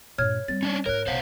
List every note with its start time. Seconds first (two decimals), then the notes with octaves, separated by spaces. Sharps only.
0.18 G2 A#2 C#5 F6 G#6
0.48 G3 C4 A6
0.63 C#4 D4 C#5
0.86 G#2 A3 A#4 C#5 F#6
1.07 B1 C5 F5 F#5